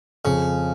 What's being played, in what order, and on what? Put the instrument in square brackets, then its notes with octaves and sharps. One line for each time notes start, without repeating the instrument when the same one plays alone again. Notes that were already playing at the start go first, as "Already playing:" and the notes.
[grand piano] F2 [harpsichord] C#3